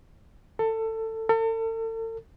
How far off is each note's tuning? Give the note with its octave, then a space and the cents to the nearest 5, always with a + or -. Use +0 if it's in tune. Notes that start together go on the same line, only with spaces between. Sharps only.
A4 +20
A4 +40